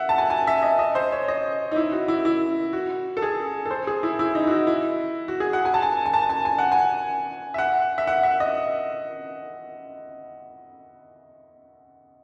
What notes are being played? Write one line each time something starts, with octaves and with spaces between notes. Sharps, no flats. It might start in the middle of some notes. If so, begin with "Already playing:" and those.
Already playing: E5 F#5
A5
G#5
G#5
E5
D#5
D#5
C5
C#5
D#5
D#4
E4
F#4
E4
E4
F#4
A4
G#4
A4
C5
G#4
E4
E4
D#4
F#4
E4
E4
F#4
G#4
F#5
G#5
A5
G#5
G#5
A5
G#5
G#5
F#5
G#5
E5
F#5
E5
F#5
E5
D#5